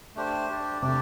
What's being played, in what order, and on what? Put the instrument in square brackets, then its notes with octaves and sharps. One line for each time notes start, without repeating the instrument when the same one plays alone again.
[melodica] A3 D4 G4 C5
D4 G4 D5
[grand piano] C3 [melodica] A3 D4 G4 D5